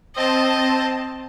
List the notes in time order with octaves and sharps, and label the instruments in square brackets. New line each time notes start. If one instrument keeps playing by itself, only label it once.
[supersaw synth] C4 A5 [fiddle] D#5